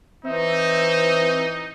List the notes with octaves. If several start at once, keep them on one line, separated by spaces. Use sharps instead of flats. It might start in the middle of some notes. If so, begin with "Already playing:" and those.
E3 C4 D#4 E5